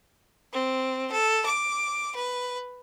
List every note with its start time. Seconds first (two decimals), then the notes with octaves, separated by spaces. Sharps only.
0.53 C4
1.11 A4
1.47 D6
2.17 B4